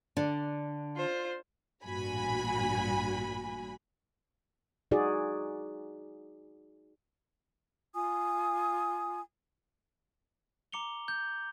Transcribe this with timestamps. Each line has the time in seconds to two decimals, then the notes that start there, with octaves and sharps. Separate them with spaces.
0.17 D3 D4
0.97 F4 C5
1.85 A1 G2 A#2 F#4 G#5 B5
4.91 D#4 F#4 G#4 D5
7.94 F4 G#5 D#6
10.72 A#5 D6 C#7 F7 G7
11.08 G6